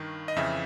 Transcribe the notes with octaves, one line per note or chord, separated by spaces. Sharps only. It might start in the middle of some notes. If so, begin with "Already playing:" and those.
Already playing: G2 D#3
D#5
F2 C#3 E3 E5